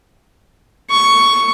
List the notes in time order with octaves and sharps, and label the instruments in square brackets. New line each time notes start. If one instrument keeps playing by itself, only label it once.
[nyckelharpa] C#6